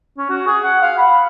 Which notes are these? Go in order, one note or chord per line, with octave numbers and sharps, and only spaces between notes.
C#4
F#4
G#4
F#5
F5
B5